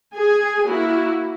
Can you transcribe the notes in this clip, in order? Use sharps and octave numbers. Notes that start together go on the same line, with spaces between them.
G#4 G#5
A#3 E4 F#4